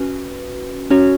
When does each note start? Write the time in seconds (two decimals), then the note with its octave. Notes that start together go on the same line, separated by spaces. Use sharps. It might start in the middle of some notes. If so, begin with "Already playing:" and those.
Already playing: C#4 F#4 B4
0.90 C#4 F#4 C#5